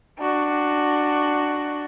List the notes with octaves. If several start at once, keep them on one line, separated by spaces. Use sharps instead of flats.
D4 F#4